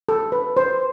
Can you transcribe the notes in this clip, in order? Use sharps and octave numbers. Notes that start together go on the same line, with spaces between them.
A4
B4
C5